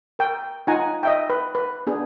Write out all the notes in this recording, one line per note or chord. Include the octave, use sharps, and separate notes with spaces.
A#4 G5
D#4 F4 F#5 G#5 A#5
D#5 E5 G5
B4
B4
B3 D4 G#4